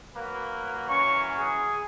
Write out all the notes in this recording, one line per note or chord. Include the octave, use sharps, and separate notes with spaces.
F#3 A#3 B4
E3 F#3 C#4 C#6
G#4